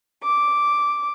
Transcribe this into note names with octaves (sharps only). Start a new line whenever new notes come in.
D6